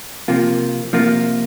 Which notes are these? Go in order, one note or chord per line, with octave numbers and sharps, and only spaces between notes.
C3 F3 A#3 F4
C3 F3 A#3 F4